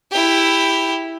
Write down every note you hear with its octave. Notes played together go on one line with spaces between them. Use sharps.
E4 G4